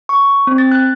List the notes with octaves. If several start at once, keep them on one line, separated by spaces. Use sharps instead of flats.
C#6
C4
A6
F#6